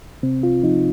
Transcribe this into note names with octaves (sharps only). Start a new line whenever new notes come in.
C3 C4
F4
F3 D#4